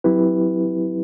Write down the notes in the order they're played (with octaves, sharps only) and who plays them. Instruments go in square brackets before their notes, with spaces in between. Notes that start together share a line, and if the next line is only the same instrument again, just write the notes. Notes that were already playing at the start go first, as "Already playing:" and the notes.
[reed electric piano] F#3 C4 E4 G4 B4